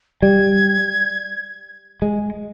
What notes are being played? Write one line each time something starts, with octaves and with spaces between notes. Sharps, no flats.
G3 G#6
G#3